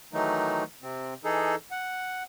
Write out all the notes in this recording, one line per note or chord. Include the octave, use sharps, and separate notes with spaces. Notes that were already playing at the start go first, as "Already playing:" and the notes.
D#3 E3 F#3 A3 D#4
C3 C4
E3 D#4 G#4 A4
F#5